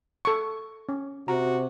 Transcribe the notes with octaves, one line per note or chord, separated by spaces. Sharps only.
A4 C#6
C#4
C3 F#4 A#5